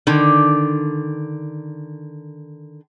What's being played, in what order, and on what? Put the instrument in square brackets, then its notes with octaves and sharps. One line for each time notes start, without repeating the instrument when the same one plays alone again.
[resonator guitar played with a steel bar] D3 D#3